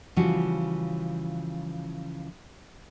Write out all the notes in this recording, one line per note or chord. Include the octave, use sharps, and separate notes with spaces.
C#3 E3 F3 G3 F#4